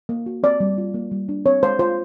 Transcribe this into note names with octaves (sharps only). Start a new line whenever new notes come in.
A#3
F#4
C4 D5
G3
F4
A#3
G3
D4
C4 C#5
G#3 C5
F4 C5